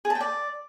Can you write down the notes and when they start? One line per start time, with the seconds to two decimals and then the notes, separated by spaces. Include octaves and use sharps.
0.05 G#4
0.10 A5
0.15 G5
0.20 D5